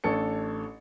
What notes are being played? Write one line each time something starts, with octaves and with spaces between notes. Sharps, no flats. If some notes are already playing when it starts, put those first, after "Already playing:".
A1 D4 A4 C#5 C#7